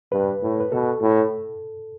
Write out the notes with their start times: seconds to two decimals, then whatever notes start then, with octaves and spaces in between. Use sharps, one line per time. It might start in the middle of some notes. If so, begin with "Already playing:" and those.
0.12 G2 B4
0.43 A2
0.60 B4
0.72 B2 A4
1.01 A2